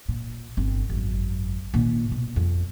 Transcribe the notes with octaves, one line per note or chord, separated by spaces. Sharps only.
A#2
G1 C4
G#1 F#2
A#2 D#3
B2
F2